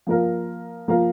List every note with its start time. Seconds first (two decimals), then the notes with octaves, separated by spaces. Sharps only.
0.07 F3 A#3 F4 A#4 F5
0.88 F3 A#3 F4 A#4 F5